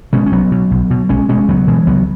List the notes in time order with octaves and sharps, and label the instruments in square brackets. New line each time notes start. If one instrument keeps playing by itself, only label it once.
[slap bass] B2 G#3 C#4
C#4
B1 F#3 B3
B2
B1
B2
B1 G#3 C#4
B2 G#3 C#4
C#2 F#3 B3
B2 E3 G#3
C#2 F#3 B3